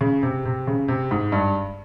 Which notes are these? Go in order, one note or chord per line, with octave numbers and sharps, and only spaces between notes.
C#3
C3
C3
C#3
C3
G#2
G2